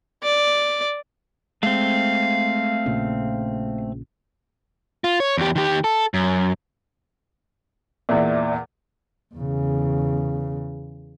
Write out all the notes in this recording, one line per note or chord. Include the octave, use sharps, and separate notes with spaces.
D5
G#3 A3 C4 F5
A#1 A#2 C#3
F4
C#5
E2 G4
D#3 G4
A4
F#2
E2 A#2 D5 E5
E2 C#3